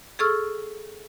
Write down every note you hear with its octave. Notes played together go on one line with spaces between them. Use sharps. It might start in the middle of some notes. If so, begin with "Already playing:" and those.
G#4 A4 C#6 E6 F6